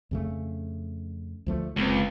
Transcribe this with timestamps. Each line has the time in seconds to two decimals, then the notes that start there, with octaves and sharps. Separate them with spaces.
0.11 F2 C#3 A3
1.46 D2 F3 A3
1.76 F1 C#2 A#3 C4